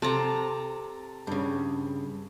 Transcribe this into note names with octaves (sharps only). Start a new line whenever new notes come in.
C3 A4 A5 A#5
G2 C#3